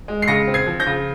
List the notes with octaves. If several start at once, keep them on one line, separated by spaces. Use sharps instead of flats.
G#3
C7
C#3 A#6 C#7
C4
G#6 C7
F3
G6 A#6
C#3